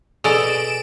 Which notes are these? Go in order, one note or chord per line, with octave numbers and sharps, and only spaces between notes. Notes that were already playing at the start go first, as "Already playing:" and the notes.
B2 G#4 A4 D5 D#5 E6 D7 E7